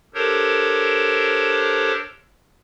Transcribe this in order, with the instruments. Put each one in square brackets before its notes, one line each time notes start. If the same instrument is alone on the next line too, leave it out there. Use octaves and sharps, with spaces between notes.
[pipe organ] D4 G4 A4 A#4 C5 C#5